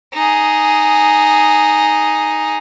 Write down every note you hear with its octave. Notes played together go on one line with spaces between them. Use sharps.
D#4 G#4